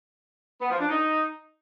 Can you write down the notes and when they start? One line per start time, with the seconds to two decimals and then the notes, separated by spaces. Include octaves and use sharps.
0.61 B3
0.70 F3
0.79 D4
0.89 D#4